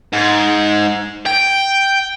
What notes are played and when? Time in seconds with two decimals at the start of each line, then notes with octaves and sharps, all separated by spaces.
0.13 G#2
1.26 G5